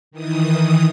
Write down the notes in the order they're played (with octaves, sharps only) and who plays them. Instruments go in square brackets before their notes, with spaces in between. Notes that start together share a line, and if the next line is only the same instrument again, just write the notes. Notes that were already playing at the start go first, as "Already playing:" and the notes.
[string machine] D#3 E3 D#6